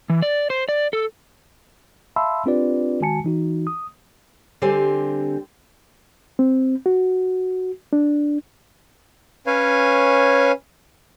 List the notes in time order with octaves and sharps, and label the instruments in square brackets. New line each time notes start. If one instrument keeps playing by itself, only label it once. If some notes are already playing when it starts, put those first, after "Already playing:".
[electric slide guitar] E3
D5
C5
D5
A4
[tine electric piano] E5 F5 A5 B5 C6 E6
C4 D4 F4 G4 B4 D5
D#3 G#3 F#4 G#5 A5 C#7
E3 D#4 F#4
D#6
[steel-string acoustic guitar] D3 G3 C4 G4 C5 G#5
[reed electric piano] C4
F#4
D4
[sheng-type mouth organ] C#4 B4 C#5 F5 G#5